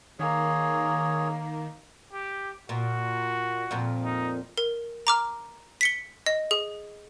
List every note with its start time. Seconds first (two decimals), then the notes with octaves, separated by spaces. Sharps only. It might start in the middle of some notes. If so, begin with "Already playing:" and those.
0.19 D#3 A#3 G#4 C#5
2.12 G4
2.69 A#2 F#4
3.71 F2 A#2
4.04 D#4
4.57 A#4
5.07 A#5 D6 F6
5.81 B6 C#7 G7
6.26 D#5
6.51 G#4